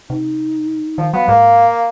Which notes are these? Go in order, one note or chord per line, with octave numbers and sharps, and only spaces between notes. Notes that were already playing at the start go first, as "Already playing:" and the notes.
C3 D#4
D#3 F3
F#3 B3 F5
G#2 A#3